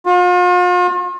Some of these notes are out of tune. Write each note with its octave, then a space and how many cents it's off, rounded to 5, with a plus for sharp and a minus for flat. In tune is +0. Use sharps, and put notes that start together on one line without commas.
F4 +40